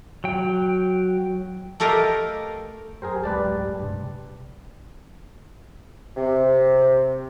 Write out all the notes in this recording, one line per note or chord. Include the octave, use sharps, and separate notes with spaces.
F#3 G5
A3 G4 A4 A#4 D#5 F5
F#2 G4 G#4 A#4 C5
D1 G#3 A3 B4 D5 A5
G2 C3
C3